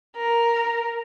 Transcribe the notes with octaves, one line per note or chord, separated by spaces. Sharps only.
A#4